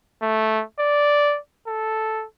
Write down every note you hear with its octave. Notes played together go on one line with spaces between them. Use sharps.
A3
D5
A4